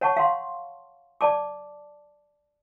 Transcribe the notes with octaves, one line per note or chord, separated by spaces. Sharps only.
C#5 F#5 A5 C#6
F5 F#5 C6
D5 A5 D6